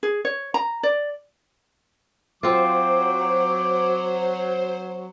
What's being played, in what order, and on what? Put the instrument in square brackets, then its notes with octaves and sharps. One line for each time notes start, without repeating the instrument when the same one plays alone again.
[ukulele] G#4
C#5
A#5
D5
[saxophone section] F#3 [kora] C4 F4 [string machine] C5 [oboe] D6